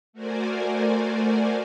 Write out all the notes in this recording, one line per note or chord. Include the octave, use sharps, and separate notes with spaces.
A3 F#4 A#4 C5 D5 G#5